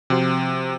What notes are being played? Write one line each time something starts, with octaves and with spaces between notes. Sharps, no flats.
C3 F3 C4 F#4 C5